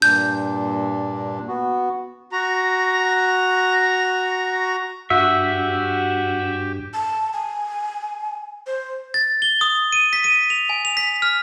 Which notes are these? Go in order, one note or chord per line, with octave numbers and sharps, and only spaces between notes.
G2 A#2 D4 G6
B3 F#4
F#4 A#5
G2 F#4 G4 E5
A5
G#5
C5
A6
G7
D#6
D#7
B6
D#7
F7
G#5
F7
B6
F6